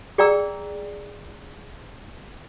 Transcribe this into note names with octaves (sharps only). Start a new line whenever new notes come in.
G#4 D5 G5 A#5 E6